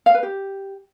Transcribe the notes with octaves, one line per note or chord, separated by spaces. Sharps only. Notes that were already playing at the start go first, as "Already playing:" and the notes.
F5
B4
G4